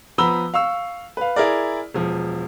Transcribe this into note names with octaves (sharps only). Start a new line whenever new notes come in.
F3 B3 A#5 B5 E6 G7
F5 C#6 E6
B4 F5
E4 G#4 A#4 D5
E1 F3